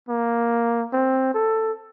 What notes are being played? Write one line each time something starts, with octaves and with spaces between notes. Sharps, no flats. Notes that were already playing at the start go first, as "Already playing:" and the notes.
A#3
C4
A4